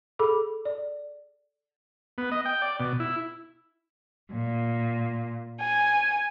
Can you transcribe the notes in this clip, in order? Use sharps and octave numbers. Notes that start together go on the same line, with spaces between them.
G#4 A4 B5 D6
D5
B3
D#5
G5
D5
B2
E4
A#2
G#5